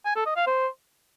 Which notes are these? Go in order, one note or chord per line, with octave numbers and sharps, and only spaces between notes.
G#5
A4
D#5
F5
C5